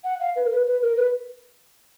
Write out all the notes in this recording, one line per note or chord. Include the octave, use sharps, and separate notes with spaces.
F#5
F5
B4
A#4
B4
B4
A#4
B4